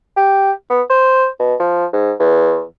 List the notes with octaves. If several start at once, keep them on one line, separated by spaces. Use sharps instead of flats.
G4
B3
C5
B2
F3
G#2
E2